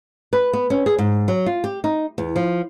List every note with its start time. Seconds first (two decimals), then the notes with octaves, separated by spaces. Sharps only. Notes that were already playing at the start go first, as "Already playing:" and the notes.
0.33 B4
0.53 B3
0.70 C#4
0.86 G#4
0.99 G#2
1.28 F#3
1.46 F4
1.64 G4
1.84 D#4
2.18 E2
2.36 F3